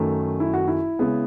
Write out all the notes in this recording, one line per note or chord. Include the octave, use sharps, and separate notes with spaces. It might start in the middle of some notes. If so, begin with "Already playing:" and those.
Already playing: F#2 D#3 A3
E4
F#4
E4
C#3 G#3 B3